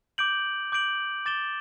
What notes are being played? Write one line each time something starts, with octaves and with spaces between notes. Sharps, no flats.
D6 G6 D7 F#7
D6 G6 D7 F#7
D6 A6 E7 G7